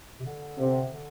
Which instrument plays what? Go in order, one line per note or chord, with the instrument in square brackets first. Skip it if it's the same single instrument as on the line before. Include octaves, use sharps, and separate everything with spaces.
[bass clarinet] C3
D3
[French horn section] C3
[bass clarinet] D3